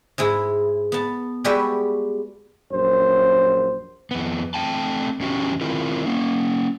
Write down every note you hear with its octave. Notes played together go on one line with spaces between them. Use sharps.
G#2 G#3 E4
B3 A5
G3 G#3 F#4 G4 B4 E5
A#1 F#2 C5
F2 B3
A3 C4 G5 A5
E2 C#4 F#4 G4
D#3 C4 E4 F4 A#4
A#3 C#4